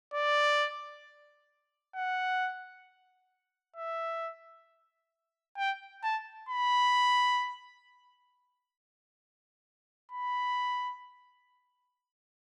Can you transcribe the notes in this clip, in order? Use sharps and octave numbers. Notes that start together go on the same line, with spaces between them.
D5
F#5
E5
G5
A5
B5
B5